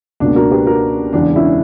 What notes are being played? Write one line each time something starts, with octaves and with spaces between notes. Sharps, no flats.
C#2 B2 A#3 D4
F#4 A#4
G4 B4
F#4 A#4
E1 E2 C#3 D4
C#4 E4